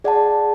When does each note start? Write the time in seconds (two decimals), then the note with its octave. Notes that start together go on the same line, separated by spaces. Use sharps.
0.04 G#4 D5 F#5 A5